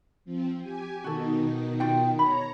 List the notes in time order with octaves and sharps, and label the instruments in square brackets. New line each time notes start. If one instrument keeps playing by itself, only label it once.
[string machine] F3 C4
G4 G#5
[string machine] B2 D#3 D#4 [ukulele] F#4 A4
[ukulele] F4 G5
[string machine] C#5 A#5 [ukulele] B5